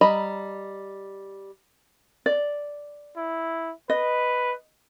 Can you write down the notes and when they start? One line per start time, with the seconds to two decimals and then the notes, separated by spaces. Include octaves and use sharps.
0.01 G3 D#5 A#5 B5
2.26 D5
3.17 E4
3.90 B4 D#5